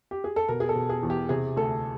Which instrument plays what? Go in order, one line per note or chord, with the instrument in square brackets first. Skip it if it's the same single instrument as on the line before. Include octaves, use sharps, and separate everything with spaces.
[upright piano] G4
G#4
A4
B2 A#4
G#4
A4
B2
G#4
E2
G4
C3 G#4
D2 A4